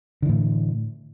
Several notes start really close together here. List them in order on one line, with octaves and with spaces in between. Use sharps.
D3 E3 A2